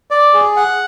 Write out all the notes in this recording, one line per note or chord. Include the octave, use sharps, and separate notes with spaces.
D5
G#4
F#5